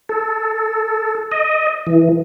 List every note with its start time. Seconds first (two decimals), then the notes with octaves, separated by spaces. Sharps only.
0.09 A4
1.32 D#5
1.87 E3